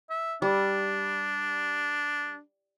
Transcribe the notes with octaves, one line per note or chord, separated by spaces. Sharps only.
E5
G3 D4